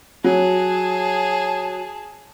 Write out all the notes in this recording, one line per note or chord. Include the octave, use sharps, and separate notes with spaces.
F#3 G#4 A5